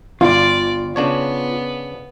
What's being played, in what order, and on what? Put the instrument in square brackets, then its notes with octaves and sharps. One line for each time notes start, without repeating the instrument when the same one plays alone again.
[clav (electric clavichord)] G1 [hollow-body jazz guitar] F4 [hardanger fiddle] D5
[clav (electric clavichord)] C#3 D4 C#5 [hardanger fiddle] B3